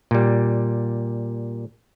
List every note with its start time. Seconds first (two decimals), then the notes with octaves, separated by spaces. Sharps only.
0.11 A#2 G3